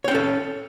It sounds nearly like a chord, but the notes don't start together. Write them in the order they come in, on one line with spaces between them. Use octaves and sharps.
C#5 G5 C#4 A4